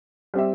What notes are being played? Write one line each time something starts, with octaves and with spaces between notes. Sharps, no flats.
G3 C4 G4 E5